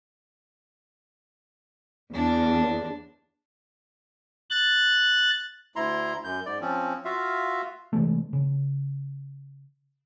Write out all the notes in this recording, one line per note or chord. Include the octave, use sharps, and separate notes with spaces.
E2 D4
F#6 A6
D2 E4 A#5 C6
F#2 G6
G#2 D5
F3 C4 C#4
F4 F#4 E5 F5
C3 E3 G#3 A3
C#3